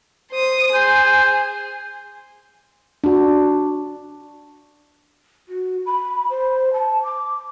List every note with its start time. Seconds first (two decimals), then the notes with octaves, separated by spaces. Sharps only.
0.32 C5 D#6
0.74 G#4 C5
3.04 D4 F#4
5.49 F#4
5.86 B5
6.30 C5
6.74 A5
7.03 D6